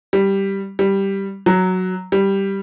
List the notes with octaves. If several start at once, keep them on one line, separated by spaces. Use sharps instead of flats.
G3
G3
F#3
G3